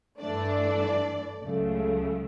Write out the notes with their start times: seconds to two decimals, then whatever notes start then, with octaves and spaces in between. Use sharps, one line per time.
0.19 G2 E3 A3 D4 D5
1.41 C#2 C#3 F#3 A3